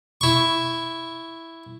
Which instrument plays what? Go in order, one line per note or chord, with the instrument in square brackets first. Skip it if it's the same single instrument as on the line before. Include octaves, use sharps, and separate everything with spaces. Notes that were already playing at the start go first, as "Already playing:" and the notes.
[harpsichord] E4 C#6